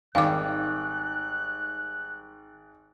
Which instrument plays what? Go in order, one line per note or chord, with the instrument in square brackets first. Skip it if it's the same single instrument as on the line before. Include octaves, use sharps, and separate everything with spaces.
[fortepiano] G#1 [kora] D#3 G3 [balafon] F5 D6 [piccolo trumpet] F#6